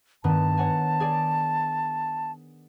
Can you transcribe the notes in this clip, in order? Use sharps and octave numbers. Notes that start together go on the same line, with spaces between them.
G2 D#3 B3 A5
C#5 F#5 G#5
G#4 D5